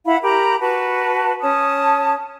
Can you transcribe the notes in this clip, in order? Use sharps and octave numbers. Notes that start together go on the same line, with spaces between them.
E4 F5 F#5 B5
G4 A#4 A#5 B5
F#4 B4 A5
C#4 A5 D#6